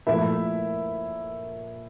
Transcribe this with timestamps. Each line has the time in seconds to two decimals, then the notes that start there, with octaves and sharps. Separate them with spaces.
0.07 A#2 F3 A3 E4 E5